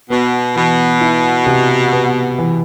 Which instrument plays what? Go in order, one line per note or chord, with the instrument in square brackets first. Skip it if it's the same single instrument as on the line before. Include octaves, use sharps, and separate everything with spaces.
[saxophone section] B2 [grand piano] B3
[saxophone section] B2 [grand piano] E3
[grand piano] E4
C3
B3
E3